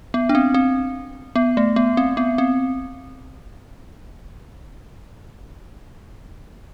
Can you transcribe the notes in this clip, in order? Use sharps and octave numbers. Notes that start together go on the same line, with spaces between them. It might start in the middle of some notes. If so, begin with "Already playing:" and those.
B3
D4
C4
C4
B3
A3
B3
C4
B3
C4